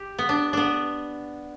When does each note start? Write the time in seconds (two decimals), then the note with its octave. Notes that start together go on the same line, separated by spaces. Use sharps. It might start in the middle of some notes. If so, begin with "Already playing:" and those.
Already playing: G4
0.18 B3
0.29 D4
0.53 B3 D4